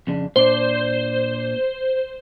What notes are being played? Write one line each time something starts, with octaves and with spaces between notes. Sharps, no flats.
F2 C#3 D4
A#2 D4 C5 D5